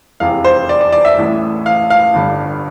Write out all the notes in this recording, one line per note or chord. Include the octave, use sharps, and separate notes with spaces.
F1 E2 C3 E3 F5
C5
D5
D5
D5
E5
A1 A2 E3
F5
F5
G1 G2 D3